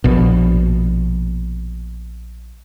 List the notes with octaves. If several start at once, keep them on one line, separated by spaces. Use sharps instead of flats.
A#1 B2